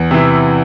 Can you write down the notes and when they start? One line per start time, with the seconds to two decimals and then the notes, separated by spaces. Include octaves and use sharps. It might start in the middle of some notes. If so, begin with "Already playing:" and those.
Already playing: E2
0.11 C3 E3